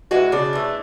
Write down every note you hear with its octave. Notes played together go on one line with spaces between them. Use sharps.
E3 G#3 F#4
C#3 D4
E3 A3